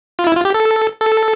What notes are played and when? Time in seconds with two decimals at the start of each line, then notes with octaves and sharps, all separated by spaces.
0.19 F4
0.27 E4
0.36 F4
0.45 G4
0.54 A4
1.01 A4